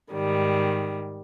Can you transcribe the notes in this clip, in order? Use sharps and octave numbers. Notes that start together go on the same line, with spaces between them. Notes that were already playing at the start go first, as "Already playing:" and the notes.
G#2 D#3 G3